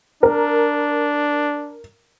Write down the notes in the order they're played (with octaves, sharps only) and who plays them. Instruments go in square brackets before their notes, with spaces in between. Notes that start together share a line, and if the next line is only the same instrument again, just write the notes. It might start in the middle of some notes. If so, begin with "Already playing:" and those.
[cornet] D4 [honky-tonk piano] A#4